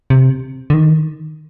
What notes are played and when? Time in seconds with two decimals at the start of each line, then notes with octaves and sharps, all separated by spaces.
0.10 C3
0.70 D3
0.74 D#3